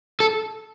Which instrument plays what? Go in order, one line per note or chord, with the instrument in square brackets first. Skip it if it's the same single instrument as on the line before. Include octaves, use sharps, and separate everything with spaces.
[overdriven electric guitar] A4